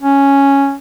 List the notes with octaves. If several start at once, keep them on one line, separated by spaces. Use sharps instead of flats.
C#4